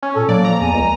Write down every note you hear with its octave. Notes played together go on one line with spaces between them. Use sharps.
C#4
A#2 A4
F#3 A#3 D5
F3 A#5
E2 G#5
C#2